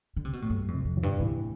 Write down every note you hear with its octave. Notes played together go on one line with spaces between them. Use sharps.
D3
C3
B2
A2
G2 A3
F2
C3
F2
E2
G2
A2 E3